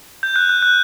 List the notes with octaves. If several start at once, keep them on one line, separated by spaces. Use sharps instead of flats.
G6
F#6
F#6
F#6